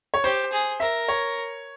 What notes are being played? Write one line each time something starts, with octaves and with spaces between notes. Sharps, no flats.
C#5
G4 C5
G#4
A#4 E5
C#5